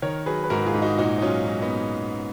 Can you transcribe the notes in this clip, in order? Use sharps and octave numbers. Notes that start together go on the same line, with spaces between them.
D#3 A#4 C#5
F#3 G#4 B4
B4
G#2 F#4 A#4
F4 G#4
G#2
D#4 F#4
A#2 D#4 F#4
D#4
F#3 C#4 F4
F#3
B3 D#4